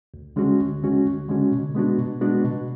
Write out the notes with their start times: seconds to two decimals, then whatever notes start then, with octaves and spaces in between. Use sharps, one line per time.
0.14 D2
0.36 D3 G#3 C#4 F#4
0.60 D2
0.83 D3 G#3 C#4 F#4
1.05 D2
1.29 D3 G#3 C#4 F#4
1.52 B2
1.75 G#3 B3 D4 F#4
1.98 B2
2.21 G#3 B3 D4 F#4
2.44 B2